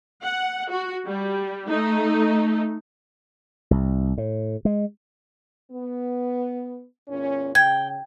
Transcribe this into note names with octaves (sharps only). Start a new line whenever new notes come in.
F#5
F#4
G3
A3 D#4
C2
A2
G#3
B3
E2 A#2 C#4
C#3 G5 G#6